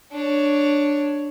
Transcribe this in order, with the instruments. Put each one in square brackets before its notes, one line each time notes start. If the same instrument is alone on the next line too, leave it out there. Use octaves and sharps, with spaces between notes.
[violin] D4 C#5